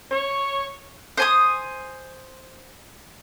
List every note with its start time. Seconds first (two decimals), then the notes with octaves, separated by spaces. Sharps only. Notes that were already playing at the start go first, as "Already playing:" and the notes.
0.11 C#5
1.17 C5 G#5 D#6